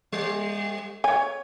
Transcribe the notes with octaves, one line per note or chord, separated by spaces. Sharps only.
G3
C#5 G#5